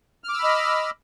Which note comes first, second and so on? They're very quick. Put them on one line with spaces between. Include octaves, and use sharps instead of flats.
F6 D6 E6 B5 D#5